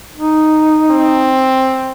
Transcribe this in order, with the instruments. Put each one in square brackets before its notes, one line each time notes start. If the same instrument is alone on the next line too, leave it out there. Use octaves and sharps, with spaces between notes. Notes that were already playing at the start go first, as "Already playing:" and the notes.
[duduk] D#4
[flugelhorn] C4